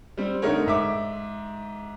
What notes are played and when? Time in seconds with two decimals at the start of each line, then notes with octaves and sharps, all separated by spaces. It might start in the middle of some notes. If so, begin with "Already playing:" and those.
0.17 G3 C4
0.42 D3 A3 D#4 A#4 C#5
0.66 G#2 E5 D6